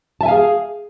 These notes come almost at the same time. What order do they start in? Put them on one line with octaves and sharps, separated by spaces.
A5 E5 G#5 F5 G#4